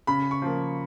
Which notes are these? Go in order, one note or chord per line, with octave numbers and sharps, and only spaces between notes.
C#3 B5
C#6
F3 A#3